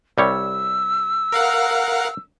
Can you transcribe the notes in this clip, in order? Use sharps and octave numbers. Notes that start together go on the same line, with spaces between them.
C2 G3 C#5 E6
A#4 F5 F#5